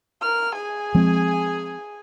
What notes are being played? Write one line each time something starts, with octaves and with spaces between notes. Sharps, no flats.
A#4 F6
G#4 G#5
F3 G#3 C4